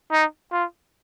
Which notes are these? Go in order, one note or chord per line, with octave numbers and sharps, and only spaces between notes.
D#4
F4